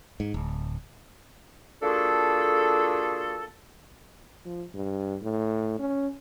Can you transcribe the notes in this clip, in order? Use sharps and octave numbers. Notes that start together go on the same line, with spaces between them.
G#2
D1
A#3 D4 F4 F#4 G#4 A4
F3
G2
A2
C#4